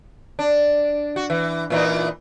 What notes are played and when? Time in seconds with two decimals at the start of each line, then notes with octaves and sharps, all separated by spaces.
0.39 D4
1.16 F#4
1.30 E3
1.70 A#2 E3 D#4